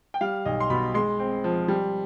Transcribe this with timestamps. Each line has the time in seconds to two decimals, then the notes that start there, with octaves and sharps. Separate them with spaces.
0.14 G5
0.21 G3 F5
0.45 B1 D#5
0.60 C6
0.70 B2 B5
0.94 G#3 C6
1.19 C4
1.44 F3
1.68 G3